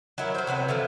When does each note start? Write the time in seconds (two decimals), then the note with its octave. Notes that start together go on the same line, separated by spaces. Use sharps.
0.18 F#3 E4 A#4
0.35 F#3 C5
0.47 C3 F#3 B3
0.68 D3 E3 F3